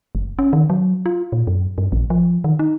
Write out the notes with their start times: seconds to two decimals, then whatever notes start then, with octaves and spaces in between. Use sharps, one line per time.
0.15 F#1
0.39 C#4
0.53 D#3
0.70 F#3
1.06 F4
1.32 A#2
1.47 F#2
1.78 G2
1.92 A#1
2.10 F3
2.44 D#3
2.59 D#4